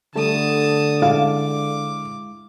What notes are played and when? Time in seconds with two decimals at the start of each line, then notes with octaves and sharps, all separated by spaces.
0.16 D3 G3 A3 A4 A5 D#6
1.02 G#3 E4 F5 D6